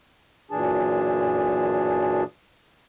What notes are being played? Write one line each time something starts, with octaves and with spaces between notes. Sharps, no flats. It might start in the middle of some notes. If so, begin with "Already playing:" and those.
F#2 A#2 E3 D4 G#4 A5